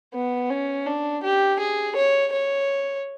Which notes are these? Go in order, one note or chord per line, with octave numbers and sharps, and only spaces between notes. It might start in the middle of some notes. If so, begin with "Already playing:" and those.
B3
C#4
D4
G4
G#4
C#5
C#5